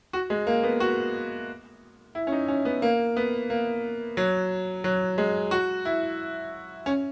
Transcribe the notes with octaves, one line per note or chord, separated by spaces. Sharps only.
F#4
G#3
A#3
B3
F#4
E4
C#4
D#4
C#4
B3
A#3
B3
A#3
F#3
F#3
G#3
F#4
E4
C#4